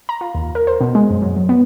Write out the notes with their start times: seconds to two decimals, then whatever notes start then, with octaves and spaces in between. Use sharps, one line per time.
0.09 A#5
0.21 F4
0.35 D#2
0.55 A#4
0.67 C5
0.81 B2
0.95 G#3
1.10 F#2
1.22 F#3
1.36 F#3
1.49 B3